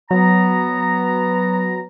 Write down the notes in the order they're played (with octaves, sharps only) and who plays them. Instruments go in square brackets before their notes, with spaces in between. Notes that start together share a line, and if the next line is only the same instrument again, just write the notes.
[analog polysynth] F#3 [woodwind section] B3 A#5